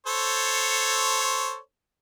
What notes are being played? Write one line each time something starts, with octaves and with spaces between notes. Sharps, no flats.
A4 C5 C#5